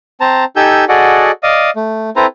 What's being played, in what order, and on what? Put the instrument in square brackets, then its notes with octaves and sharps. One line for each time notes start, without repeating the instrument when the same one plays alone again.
[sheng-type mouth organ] C4 C5 A5 A#5
D#4 G4 A4 G#5 E6 G6
F#4 G#4 A4 D5 D#5 F#5
D5 D#5 F5 D#6
A3
C4 E4 A4 B4 C5 A#5